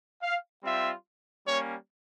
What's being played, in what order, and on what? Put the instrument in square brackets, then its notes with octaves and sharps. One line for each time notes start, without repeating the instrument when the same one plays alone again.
[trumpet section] F5
G3 C4 F4 E5
G3 A#3 C#4 C#5